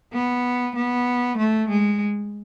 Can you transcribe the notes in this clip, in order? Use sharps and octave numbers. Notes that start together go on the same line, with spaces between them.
B3
B3
A3
G#3